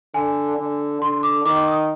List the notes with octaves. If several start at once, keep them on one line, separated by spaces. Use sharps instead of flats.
D3 G#5
D3
D3 C6
D6
D#3 D6
D#6